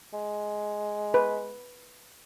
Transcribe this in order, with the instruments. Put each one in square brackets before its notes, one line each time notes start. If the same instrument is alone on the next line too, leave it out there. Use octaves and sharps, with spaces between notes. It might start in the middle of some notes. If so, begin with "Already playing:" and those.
[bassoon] G#3
[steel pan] B4